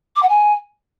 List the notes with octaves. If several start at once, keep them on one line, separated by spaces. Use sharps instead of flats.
D6
F#5
G#5